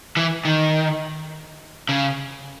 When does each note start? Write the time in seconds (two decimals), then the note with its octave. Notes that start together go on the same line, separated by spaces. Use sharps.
0.17 E3
0.45 D#3
1.89 C#3